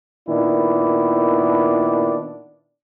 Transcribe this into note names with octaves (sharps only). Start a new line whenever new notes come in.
A#2 D#3 B3 D4 E4